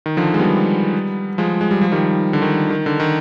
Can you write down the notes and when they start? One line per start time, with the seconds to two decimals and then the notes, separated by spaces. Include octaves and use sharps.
0.06 D#3
0.17 D3 F3
0.34 G#3
0.39 G3 B3
1.38 F3 G#3
1.61 G#3
1.71 G3
1.81 F3
1.92 D#3 G3
2.33 D3
2.42 D#3
2.70 D#3
2.86 D3
3.00 D#3